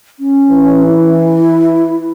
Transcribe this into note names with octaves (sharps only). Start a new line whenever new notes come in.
C#4
E3
E4